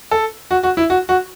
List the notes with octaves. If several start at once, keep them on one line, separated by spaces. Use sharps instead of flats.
A4
F#4
F#4
E4
F#4
F#4